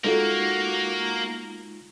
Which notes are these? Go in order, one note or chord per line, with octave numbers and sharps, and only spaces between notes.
G#3 A#3 D#4 F4 F#4 A4